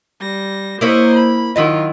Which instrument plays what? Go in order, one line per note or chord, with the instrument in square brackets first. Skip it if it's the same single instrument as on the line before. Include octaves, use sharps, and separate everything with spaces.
[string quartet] G3 A#6
[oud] A#3 E4 C#5 [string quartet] C5 D#5 C#6
[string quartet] B5
[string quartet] D#3 F4 [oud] F#3 E4 D#5